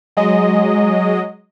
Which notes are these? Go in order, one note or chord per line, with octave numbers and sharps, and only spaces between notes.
F#3 G#3 D#5